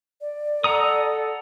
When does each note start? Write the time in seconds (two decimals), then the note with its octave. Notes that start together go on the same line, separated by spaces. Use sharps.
0.21 D5
0.64 A4 F#5 A#5 D#6